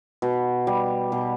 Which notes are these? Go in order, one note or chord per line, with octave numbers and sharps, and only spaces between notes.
B2
G3
B2